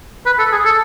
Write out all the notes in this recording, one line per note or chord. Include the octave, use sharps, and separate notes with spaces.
B4
A4
G#4
A4